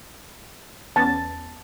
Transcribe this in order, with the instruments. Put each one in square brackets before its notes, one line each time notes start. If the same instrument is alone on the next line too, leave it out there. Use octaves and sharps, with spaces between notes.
[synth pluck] E2 B3 C#4 [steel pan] A5